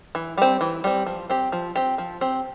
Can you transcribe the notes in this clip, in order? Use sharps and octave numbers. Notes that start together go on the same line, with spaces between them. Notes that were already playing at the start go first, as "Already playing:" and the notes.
E3
G3 C4
E3
G3 C4
F3
C4 G4
F3
C4 G4
F3
C4 G4